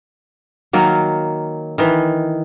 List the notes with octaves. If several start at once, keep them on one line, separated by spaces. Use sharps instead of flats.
D#3 F#3 A#3
D#3 E3